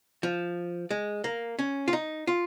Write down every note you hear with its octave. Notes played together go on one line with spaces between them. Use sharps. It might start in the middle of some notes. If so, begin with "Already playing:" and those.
F3
G#3
A#3
C#4
F4
D#4
F4